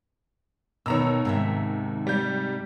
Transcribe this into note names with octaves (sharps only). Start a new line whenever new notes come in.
D#2 B2 C#5 A#5 E6
G#2 C3 E5
G3 G6